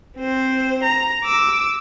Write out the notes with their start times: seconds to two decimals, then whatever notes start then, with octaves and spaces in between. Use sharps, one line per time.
0.18 C4 C5
0.84 A#5
1.24 D6 E6